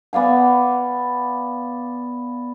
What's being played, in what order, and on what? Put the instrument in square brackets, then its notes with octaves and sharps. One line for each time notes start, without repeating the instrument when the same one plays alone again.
[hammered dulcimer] B3 D5 F5 G#5